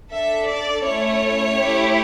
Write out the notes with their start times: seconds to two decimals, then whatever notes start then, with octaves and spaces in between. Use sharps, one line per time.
0.10 D4 A4 E5
0.47 D5
0.84 A3 C#4 E4 C#5
1.58 A3 E4 G4